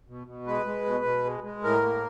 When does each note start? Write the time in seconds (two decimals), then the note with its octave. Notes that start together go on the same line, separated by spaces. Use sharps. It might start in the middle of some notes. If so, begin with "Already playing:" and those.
0.08 B2
0.27 B2
0.46 G#3 B4
0.66 G#3
0.86 B2
1.05 B2
1.24 G#3
1.44 G#3
1.63 A2 A#4
1.83 A#3